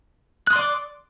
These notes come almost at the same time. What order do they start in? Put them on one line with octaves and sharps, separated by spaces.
F#6 D#6 C6 D5 D6